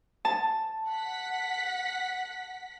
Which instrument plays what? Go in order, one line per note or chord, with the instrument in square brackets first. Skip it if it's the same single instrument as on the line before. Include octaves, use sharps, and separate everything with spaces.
[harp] A5
[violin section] F#5 B6